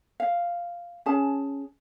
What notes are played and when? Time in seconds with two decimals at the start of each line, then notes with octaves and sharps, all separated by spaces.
0.20 F5
1.06 C#4 G#4 A5